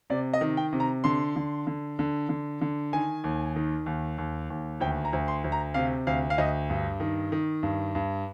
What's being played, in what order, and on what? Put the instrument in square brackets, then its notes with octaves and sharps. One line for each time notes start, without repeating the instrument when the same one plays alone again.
[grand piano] C3 D5
D#5
D#3
G5
C3
A#5
D3 C6
D3
D3
D3
D3
D3
D#3 G#5
D#2
D#3
D#2
D#2
D#2
D2 G5
A#5
D2
C6
D2
A#5
C3 F5
D2 F5
F5
D2 D#5
G2
D#3
D#3
G2
G2